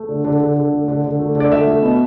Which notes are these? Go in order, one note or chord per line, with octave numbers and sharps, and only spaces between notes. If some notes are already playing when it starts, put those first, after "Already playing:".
Already playing: A3
D3
D3
D3
D3
A3
D3
D3
A3
D3
D5
A3 E5
A3
B2